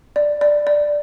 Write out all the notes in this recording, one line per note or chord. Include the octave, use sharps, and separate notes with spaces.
D5
D5
D5